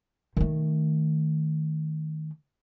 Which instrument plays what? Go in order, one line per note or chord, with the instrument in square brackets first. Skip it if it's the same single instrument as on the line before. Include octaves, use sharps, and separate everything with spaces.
[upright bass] D#3 A3